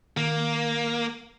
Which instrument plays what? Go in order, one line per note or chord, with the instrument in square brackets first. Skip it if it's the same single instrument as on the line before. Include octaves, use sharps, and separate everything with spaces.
[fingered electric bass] D#3 [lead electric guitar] A#3